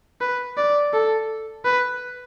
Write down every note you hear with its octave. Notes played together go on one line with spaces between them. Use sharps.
B4
D5
A4
B4